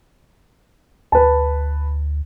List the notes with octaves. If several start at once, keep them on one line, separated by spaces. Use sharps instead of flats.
D2 B4 A5